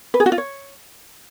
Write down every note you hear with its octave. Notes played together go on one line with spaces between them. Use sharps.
B4
G#4
F#4
F4
C#5